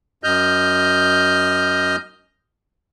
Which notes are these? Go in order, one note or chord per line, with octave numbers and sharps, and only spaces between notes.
F#2 D#5 F6 G6